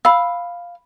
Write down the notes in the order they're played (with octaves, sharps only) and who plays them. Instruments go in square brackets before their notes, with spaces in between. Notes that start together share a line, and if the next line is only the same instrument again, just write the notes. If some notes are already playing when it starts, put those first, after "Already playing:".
[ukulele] F5 [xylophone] B5 E6